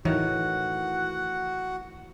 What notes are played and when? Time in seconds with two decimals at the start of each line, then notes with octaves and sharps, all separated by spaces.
0.05 A2 D#3 E3 F#4 F#5